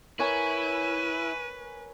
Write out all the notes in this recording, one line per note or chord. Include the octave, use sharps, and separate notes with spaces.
E4 A#4 B4 C#5 G#5 D#7